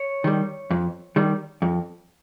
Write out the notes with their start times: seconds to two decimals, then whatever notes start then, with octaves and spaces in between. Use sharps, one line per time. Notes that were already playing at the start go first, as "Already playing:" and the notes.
Already playing: C#5
0.24 D#3 G3
0.71 F2
1.16 D#3 G3
1.62 F2